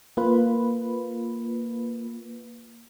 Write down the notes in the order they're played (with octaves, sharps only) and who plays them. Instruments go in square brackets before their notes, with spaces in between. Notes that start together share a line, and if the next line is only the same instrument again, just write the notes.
[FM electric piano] A#3 F4 B4